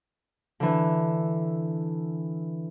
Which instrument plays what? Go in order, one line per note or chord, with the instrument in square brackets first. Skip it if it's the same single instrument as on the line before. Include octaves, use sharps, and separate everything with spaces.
[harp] D3 E3